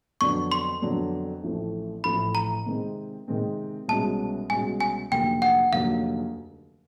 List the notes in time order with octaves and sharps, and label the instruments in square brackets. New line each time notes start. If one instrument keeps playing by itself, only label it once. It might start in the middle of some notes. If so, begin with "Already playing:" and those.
[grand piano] F2 D3 F#3 B3 D4 [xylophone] C#6
[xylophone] C6
[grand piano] F2 D3 F#3 B3 D4
A1 A2 F3 A3 C4
[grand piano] A1 A2 F3 A3 C4 [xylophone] B5
[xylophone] A#5
[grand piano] C3 D#3 G#3 C4
C3 D#3 G#3 C4
[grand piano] C2 B2 G#3 C#4 F#4 [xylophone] A5
[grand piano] C2 B2 G#3 C#4 F#4 [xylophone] G#5
[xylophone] G#5
[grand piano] F1 D#2 D3 F#3 A#3 [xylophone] G5
[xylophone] F#5
[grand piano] F1 D#2 D3 F#3 A#3 [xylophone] F5